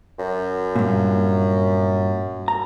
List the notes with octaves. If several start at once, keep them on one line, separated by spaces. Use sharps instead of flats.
F#2
G2 A#2
A#5